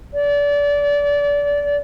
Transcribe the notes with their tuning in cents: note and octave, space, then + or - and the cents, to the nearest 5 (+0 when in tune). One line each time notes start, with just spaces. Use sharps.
D5 -25